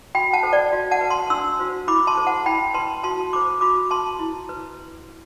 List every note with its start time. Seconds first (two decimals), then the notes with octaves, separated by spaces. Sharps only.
0.15 F#4 G5 B5
0.33 F#5 A5
0.43 A4 C5
0.53 D5 F#5
0.72 F#4
0.91 F#5 A5
1.01 B4
1.10 A5 C6
1.30 D4 C6 E6
1.59 F#4 C5
1.88 E4 B5 D6
2.07 A5 C6
2.17 A4 C5
2.27 F#5 A5
2.46 E4 G5 B5
2.74 B4 A5 C6
3.03 F#4 A5 C6
3.33 A4 C5 B5 D6
3.61 F#4 B5 D6
3.90 B4 A5 C6
4.19 E4
4.49 B4